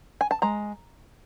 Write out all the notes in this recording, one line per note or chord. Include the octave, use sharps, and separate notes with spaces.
G#5
A5
G#3 A#5